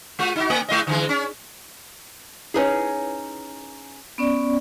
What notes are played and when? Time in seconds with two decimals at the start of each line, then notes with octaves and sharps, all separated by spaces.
0.19 G#3 F4
0.36 D#4 E4 F#4
0.50 A3
0.69 G#3 E4 D#5
0.87 D3 E3 G#3
1.09 C#4
2.54 C#4 D#4 E4 G#4 B4 C#5
4.18 B3 C#4 D5